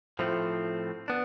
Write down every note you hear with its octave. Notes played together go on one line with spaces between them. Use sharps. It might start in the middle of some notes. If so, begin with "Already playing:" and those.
A2 F3 A3 C4
B3 D4